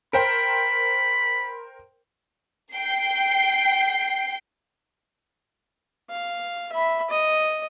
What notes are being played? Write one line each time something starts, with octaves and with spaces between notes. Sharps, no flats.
A#4 C5 G5 B5
G5 C7
F5
E5 B5
D#5